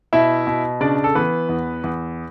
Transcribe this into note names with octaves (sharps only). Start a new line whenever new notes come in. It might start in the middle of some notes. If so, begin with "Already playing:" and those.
B2 E4 E5
B2
C#3 D4 D5
A4
E3 B3 B4
E2
E2